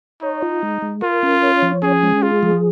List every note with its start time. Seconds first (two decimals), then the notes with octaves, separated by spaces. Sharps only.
0.22 D#4 C#5
0.42 F4
0.63 G#3
0.82 G#3
1.02 F4 A#4
1.23 C#4
1.42 C#5
1.62 F3
1.83 C#4 G#4
2.03 G#3
2.22 F4 G#4
2.43 F3